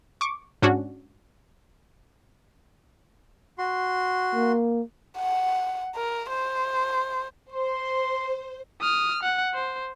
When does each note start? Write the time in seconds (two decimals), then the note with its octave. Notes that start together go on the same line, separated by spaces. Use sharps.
0.21 C#6 D6
0.62 G#2 C#4 D4 F#4
3.58 F#4 C6
4.34 A#3
5.18 F#5
5.95 A#4
6.30 C5
7.52 C5 C6
8.81 D#6 F6
9.23 F#5
9.54 C5